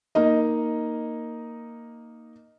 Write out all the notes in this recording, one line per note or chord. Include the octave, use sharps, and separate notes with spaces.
A#3 D#4 D#5